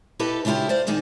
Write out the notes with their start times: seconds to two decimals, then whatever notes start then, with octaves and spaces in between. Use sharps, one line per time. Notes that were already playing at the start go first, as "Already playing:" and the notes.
0.19 E4 G4 A4 B4 D#5
0.45 C#3 D4 E4 F4 G4
0.69 C5 D5 F5
0.87 A#2 D#3 D4 D#4 G#4